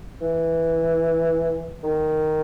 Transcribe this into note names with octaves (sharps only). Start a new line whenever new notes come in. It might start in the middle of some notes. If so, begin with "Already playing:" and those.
E3
D#3